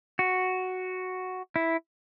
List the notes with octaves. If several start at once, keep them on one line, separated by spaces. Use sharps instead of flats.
F#4
E4